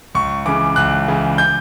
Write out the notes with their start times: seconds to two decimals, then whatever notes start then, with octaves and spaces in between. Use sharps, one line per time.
0.15 C#2 C#6
0.46 C#3 E3 D6
0.76 C#2 F#6
1.08 C#3 E3
1.38 G6